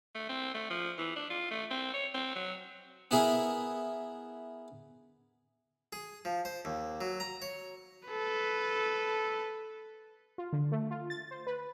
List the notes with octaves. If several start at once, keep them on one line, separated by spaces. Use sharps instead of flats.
A3
C4
A3
F3
E3
D4
F4
A3
C4
C#5
C4
F#3
B3 E4 G#4 A#4
G#4
F3
C5
D#2
F#3
A#5
C#5
A4 B4
F4
D3
A3
F4
A6
C5
B4